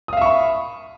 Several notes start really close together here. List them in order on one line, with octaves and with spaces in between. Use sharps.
D#6 F5 E5 C#6 B5